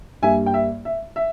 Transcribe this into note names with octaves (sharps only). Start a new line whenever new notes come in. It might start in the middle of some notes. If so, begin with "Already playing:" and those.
G2 G3 A#3 E5 G#5
G5
E5
E5
E5